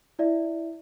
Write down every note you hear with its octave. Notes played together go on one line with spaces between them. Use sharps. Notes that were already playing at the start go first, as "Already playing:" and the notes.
E4 D5 E5